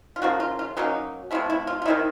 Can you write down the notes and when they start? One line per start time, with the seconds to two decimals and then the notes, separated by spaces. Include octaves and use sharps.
0.16 F4
0.22 C#3 F3 A#3 F#4
0.40 F4
0.59 F4
0.77 F#3 A#3 C#4 D#4
1.31 C3 F3 A3 E4
1.50 E4
1.67 F4
1.82 F4
1.85 D#3 G#3 C4 D#4 E4